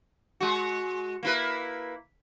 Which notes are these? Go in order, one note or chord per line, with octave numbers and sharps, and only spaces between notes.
G#3 F#4
A#3 E4 B4